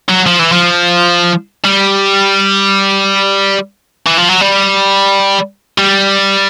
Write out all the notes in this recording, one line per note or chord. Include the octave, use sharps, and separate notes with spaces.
F#3
F3
E3
F3
G3
E3
F3
F#3
G3
G3